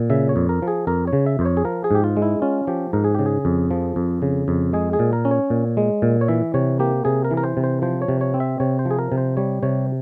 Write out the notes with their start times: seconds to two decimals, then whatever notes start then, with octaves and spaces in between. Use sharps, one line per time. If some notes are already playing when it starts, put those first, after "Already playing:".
Already playing: A#2
0.10 C#3 E5
0.29 C#5
0.36 F2
0.49 A#4
0.62 F3
0.68 G#4
0.87 F2 A#4
1.07 C#5
1.13 C#3
1.26 E5
1.39 F2 C5
1.45 C#5
1.57 G#4
1.65 F3 A#4
1.84 G#4
1.91 G#2 G4
2.04 F4
2.17 G#3
2.22 E4
2.42 C#4 F4
2.67 F3 G4
2.93 G#2 A#4
3.04 G#4
3.15 C#3 G4
3.26 G#4
3.45 F2
3.71 F3
3.96 F2
4.22 C#3
4.48 F2
4.73 G#3 G#4
4.93 G#4
4.99 A#2
5.13 A#4
5.25 C#4
5.31 C#5
5.50 A#2
5.77 G#3
6.02 A#2
6.21 C#5
6.28 E3 E5
6.54 C3 C#5
6.79 A#3 G4
7.05 C3 G#4
7.25 A#4
7.31 E3
7.37 A#4
7.44 C5
7.57 C3
7.64 C5
7.82 F3 C5
8.02 C#5
8.08 C3
8.21 C#5
8.34 C4
8.40 E5
8.60 C3 C#5
8.79 C5
8.85 F3
8.91 G#4
8.99 A#4
9.12 C3
9.18 C5
9.37 G3 C#5
9.63 C3 C#5